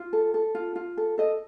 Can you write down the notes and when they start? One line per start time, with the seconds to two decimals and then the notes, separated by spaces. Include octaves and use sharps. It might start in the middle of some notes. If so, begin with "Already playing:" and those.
Already playing: F4
0.13 A4
0.34 A4
0.55 F4
0.76 F4
0.97 A4
1.18 A4 D#5